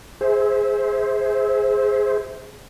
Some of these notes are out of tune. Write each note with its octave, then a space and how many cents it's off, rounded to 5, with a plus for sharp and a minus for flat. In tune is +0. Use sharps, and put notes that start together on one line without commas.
G#4 +0 C5 +0 E5 -25